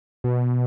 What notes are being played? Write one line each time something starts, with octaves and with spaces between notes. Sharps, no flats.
B2